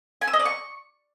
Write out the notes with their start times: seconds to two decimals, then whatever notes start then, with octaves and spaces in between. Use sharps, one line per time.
0.21 G#5
0.27 E6
0.33 D#5
0.39 D5
0.45 C#6